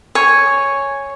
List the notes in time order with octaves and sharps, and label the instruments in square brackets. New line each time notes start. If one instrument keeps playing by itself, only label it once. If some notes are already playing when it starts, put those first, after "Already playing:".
[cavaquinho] C#5 G#5